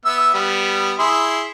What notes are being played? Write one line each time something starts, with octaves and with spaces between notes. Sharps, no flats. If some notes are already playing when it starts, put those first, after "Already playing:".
B3 E5 E6
G3 B3
E4 G#4 C6